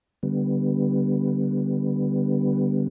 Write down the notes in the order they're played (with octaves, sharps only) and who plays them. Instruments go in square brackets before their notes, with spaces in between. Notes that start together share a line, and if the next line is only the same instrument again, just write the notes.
[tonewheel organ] D3 G3 B3